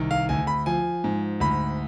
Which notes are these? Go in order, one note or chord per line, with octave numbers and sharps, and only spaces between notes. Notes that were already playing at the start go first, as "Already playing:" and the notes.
Already playing: C2 D#3
F5
D2 G#5
B5
F3 G#5
G#2
D2 B5